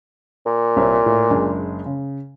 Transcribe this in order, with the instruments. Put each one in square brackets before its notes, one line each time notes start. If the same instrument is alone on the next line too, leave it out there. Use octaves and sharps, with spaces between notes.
[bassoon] A#2
[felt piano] C2 C5 C#5
A2
F#1 G#3 D4
C#3